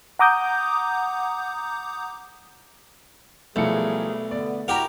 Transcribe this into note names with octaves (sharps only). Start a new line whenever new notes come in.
F#5 A#5 D6 D#6 G6
B1 F3 G3 A3 E4 G#4 A#4 C#7
D3 B3 D5
E4 F#4 G4 A#4 F#5 A#5